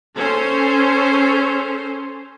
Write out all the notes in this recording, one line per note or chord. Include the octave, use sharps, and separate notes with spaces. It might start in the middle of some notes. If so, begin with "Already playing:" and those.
C#4 A4 C5